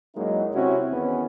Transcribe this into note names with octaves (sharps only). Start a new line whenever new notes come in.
F#2 F#3 G#3 A#3 D#4 E4
C3 C4 C#4 E4 F#4
E2 D#3 B3 C#4